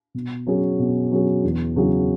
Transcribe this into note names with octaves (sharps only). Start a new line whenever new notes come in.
B2
F#3 C#4 G#4
B2
F#3 C#4 G#4
E2
C#3 F#3 E4 G#4